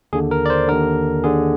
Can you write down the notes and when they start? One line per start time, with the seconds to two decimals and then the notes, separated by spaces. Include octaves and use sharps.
0.13 D#2 D3 G#4
0.31 A#4
0.46 D5
0.50 C5
0.68 D#2 D3 A#4
1.24 D#2 D3 G#4